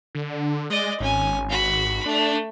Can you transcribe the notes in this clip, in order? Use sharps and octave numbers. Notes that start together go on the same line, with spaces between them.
D3
G#3 D5 D#5
G#1 C#4 G#5
F#4 B5
A3 D4